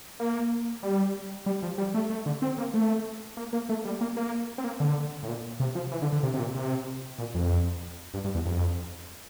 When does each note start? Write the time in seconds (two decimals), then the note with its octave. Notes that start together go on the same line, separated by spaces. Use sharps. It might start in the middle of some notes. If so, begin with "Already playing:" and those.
0.20 A#3
0.83 G3
1.46 G3
1.63 F3
1.78 G3
1.94 A3
2.10 A3
2.26 D3
2.42 C4
2.58 A#3
2.74 A3
3.37 A#3
3.53 A#3
3.69 A3
3.85 G3
4.01 A#3
4.17 A#3
4.58 C4
4.64 A#3
4.80 D3
5.22 A2
5.28 A#2
5.60 C3
5.75 F3
5.91 E3
6.02 D3
6.12 D3
6.23 C3
6.34 C3
6.39 A#2
6.55 C3
7.19 A#2
7.35 F2
8.14 G2
8.24 G2
8.35 E2
8.46 F2